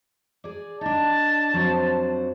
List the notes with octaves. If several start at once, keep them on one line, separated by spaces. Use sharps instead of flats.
G#4 D5
D4 D#4 A5
F2 F#3 C5